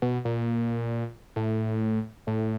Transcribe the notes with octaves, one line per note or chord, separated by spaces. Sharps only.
B2
A#2
A2
A2